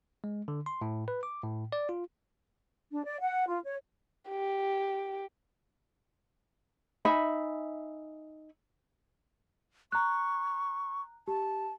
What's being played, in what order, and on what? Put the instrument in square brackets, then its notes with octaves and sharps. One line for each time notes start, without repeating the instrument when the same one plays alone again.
[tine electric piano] G#3
D3
C6
A2
B4
D6
A2
D5
F4
[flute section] D4
D5
F#5
F4
C#5
[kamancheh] G4
[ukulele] D#4 E5 G#5 B5
[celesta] A#5 F#6 [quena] C#6
[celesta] G4 [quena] A5